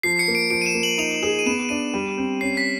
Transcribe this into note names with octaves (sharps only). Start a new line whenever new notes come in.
F3 C7
C#7
A#3
D7
F3 D7
D#7
E7
A#3
F#7
D#4 F7
G#4 E7
D#7
B3 E7
D4 D#7
G3
C4
C#4 C7
B6